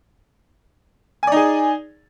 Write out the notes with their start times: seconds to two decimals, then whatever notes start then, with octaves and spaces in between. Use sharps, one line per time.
1.23 G#5
1.27 D5
1.32 D#4
1.36 G#4